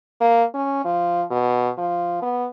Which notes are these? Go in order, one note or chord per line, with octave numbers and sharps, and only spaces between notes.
A#3
C#4
F3
B2
F3
B3